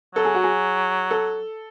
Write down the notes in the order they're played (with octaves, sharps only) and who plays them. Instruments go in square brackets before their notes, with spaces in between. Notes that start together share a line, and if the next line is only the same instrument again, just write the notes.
[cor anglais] F#3 [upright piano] A4
[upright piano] G#4
F#4
G#4
A4